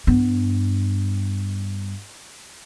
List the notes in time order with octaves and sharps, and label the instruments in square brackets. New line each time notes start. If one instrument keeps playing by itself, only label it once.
[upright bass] G2 B3